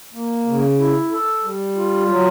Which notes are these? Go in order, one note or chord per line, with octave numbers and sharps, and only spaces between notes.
A#3
C#3
E4
A4
G3
F4
F#3